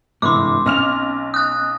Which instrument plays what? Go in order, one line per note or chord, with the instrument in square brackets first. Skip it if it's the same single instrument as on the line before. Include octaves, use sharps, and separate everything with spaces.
[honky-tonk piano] G1 [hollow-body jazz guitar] G#2 C3 E3 [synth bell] C6 D6
[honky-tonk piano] B1 F6 F7 [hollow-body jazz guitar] C4 C#4 D#5
[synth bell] D#6 F#6